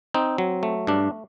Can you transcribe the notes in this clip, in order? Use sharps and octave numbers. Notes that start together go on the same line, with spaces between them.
C4 D#4
F#3
A3
G2 D4